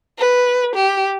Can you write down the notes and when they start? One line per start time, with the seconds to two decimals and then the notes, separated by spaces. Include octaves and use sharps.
0.19 B4
0.75 G4